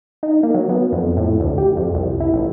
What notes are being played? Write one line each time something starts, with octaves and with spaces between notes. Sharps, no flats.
D#4
A#3
F#3
B3
F2
A2
D2
G4
F2
C2
E4
A1